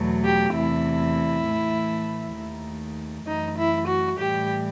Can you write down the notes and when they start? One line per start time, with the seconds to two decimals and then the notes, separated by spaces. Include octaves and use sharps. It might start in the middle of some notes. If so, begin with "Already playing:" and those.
Already playing: E2 B2 F#3 A3
0.24 G4
0.54 E2 C3 E3 A3 E4
1.45 A2 E3 A3
2.35 D#2 D#3 A3
3.26 F#2 E3 A3 D#4
3.56 E4
3.87 F#4
4.17 A2 E3 G3 G4